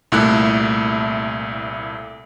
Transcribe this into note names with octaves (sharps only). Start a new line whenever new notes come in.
C2 A#2 A3 E4 F#6